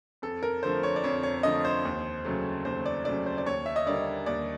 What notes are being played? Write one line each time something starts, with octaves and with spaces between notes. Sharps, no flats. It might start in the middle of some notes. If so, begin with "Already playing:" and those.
F2 A4
A#4
D3 F3 A3 C5
C#5
D5
F2 C#5
C#5
D3 F3 A3 D#5
C5
D#2
C#3 F#3 A3
D#2 C5
D5
C#3 F#3 A3 D5
C5
D5
D#2 C#5
E5
D#5
D3 G3 A#3 D5
D#2 D5